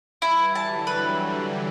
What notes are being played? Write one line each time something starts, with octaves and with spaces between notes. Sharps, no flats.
E3 G3 E4
D3 F#3 A5
B4